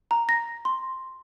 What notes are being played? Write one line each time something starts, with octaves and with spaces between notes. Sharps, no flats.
A#5
A#6
C6